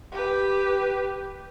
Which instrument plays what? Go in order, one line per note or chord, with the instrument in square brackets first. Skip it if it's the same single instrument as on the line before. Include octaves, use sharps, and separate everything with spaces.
[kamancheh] G4 B4